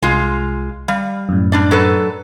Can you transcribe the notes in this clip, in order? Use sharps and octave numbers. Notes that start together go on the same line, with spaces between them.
C2 G#3 F4
G3 F5
F#2 A2
G3 D4 D5
F#3 A4 B4